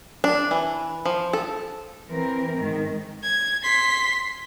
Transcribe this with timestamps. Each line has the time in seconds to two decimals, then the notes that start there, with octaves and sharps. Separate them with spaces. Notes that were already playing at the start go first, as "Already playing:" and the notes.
0.24 D4
0.51 E3
1.05 F3
1.33 A4
2.08 E3 C4 A#4
2.57 G#2 D#3
3.23 G#6
3.62 C6 B6